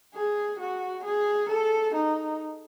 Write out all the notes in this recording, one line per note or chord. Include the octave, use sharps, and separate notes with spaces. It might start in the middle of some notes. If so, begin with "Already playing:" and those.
G#4
F#4
G#4
A4
D#4